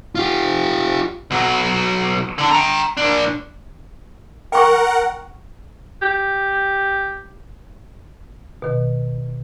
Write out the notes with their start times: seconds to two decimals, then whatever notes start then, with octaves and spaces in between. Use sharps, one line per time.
0.15 F4 G4
1.31 B1 F#3
2.38 D3 D4
2.51 G5 A#5
2.97 A#2 D4
4.52 A#4 F#5 G5 C#6
6.02 G4
8.62 B2 D#3